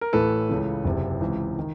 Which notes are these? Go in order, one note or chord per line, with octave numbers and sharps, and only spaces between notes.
A#4
A1 A2 E3 A4 B4
C#2 C#3 E3
F#1 E2 C3
C#2 C3 E3
D#3